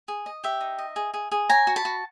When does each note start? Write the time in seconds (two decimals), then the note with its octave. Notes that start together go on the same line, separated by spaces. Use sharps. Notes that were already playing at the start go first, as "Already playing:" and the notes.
0.08 G#4
0.26 D#5
0.44 G4 E5
0.61 D#4
0.79 D#5
0.96 G#4
1.14 G#4
1.32 G#4
1.49 C#5 G#5 A#5
1.67 F#4
1.76 A5 B5
1.85 F#4